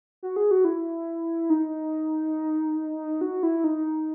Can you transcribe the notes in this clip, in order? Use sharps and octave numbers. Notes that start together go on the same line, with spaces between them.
F#4
G#4
F#4
E4
D#4
F#4
E4
D#4